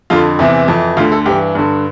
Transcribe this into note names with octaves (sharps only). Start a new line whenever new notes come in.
F2 D3 F4
E2 C3 E3 E4
F2 E3
D2 D3 F4
A4
G2 E3 G4
G2 D3